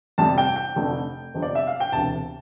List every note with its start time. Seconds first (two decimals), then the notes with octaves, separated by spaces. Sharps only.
0.18 G1 F2 C3 G3 A5
0.38 G5
0.56 G5
0.76 F1 F2 D3 A3
1.34 G1 F2 C3
1.42 D5
1.55 E5
1.67 F5
1.80 G5
1.92 E1 D2 C3 A5